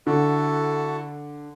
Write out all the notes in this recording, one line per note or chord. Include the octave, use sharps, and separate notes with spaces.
D3 E4 F#4 A4